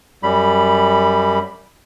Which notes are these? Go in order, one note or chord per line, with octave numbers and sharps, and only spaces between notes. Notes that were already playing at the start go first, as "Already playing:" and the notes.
F#2 G3 B5